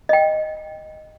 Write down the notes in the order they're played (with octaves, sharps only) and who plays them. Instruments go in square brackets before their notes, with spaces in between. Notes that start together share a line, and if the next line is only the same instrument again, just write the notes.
[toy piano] D#5 G5